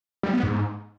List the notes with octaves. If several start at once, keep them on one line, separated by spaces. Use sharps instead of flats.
G3
B3
G#2